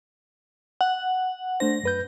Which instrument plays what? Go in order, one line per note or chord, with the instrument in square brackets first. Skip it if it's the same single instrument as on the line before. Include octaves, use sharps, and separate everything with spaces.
[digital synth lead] F#5
[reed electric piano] A3 D4 C5 [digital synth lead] A#6
[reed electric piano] F#2 B4 G6